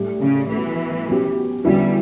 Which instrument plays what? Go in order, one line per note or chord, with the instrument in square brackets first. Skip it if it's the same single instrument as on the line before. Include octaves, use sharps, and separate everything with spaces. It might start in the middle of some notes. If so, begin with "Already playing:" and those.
Already playing: [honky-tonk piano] A2 G3 D4 G4
[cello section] C#3
[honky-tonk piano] B2 A3 C#4 F#4 [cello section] E3
[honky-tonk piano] B2 F#3 C#4 G4
[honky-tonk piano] E2 D3 F#3 C#4 E4 [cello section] G3